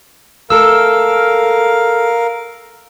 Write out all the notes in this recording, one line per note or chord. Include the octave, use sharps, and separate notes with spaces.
A3 A4 A#4 F5 E6